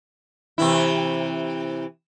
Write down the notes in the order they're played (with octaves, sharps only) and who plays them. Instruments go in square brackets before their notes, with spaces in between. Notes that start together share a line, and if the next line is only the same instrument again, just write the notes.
[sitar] C3 E3 E4